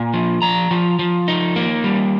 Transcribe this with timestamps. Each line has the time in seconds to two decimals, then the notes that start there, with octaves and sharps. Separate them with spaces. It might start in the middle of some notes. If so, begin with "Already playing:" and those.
Already playing: A#2 G#5
0.14 F3
0.42 F3 A#5
0.71 F3
0.99 F3
1.28 D#4
1.56 A#3
1.84 G3